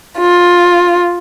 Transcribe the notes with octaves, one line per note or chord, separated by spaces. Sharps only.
F4